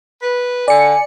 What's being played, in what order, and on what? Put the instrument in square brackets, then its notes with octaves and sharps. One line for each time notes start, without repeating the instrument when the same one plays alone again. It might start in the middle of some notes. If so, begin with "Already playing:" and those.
[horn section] B4
[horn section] D3 [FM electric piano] D5 C#7 [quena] G#5